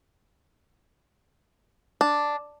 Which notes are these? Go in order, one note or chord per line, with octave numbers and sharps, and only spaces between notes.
D4